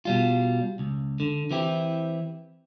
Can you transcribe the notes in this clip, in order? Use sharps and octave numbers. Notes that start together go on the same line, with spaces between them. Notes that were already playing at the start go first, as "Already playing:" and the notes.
B2 G3 F4
C#2
D3
E3 C4 E4 G4